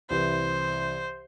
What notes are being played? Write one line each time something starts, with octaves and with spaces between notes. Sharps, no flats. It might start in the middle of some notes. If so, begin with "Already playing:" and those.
C2 E3 B4 C5